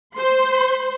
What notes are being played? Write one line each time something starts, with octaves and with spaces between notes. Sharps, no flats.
C5 C6